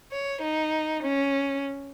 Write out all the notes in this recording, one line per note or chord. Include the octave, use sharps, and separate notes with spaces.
C#5
D#4
C#4